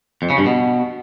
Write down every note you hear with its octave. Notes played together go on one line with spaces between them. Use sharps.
F2
C#3
G2
B2